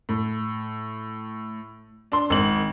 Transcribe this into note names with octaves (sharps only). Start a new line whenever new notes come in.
A2
D4 C6
G#1 C4 F#7